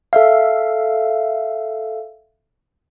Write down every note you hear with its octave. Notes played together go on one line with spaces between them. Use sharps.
A4 E5 F5